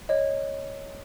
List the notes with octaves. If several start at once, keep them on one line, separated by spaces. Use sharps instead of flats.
C#5 D#5